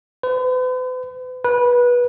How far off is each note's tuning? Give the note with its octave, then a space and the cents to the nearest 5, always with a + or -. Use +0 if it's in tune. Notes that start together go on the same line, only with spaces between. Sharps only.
B4 +45
B4 -20